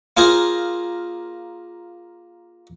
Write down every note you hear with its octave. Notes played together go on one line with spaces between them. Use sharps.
A#3 F4 G#4 A#4 C5